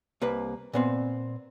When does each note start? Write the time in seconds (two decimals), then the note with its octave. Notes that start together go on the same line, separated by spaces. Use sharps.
0.21 C2 A#3 B4
0.73 A#2 B3 C4